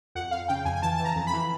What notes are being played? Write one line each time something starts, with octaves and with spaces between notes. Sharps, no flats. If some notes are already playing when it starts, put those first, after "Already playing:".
F2 F#5
F2 F5
C#3 G5
F2 G#5
G#5
E3 A5
E3 A5
A#5
F2
B5
E3